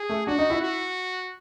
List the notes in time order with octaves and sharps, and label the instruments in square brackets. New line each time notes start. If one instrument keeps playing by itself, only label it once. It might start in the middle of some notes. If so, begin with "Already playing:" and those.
Already playing: [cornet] G#4
[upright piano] A3
[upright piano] D4 [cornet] F#4
[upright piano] D#4
E4
[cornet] F#4